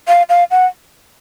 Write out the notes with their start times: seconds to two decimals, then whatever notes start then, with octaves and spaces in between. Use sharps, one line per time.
0.08 F5
0.29 F5
0.51 F#5